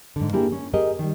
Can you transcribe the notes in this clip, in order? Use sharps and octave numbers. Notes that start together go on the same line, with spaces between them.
G#2 D3
A#3 D4 E4 G4 G#4
C#4
G4 G#4 A#4 D#5
D#3 G3